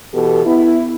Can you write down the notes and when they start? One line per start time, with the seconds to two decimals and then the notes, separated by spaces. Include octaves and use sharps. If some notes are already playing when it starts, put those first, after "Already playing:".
0.13 B2 E3 G4 A4
0.45 B3 E4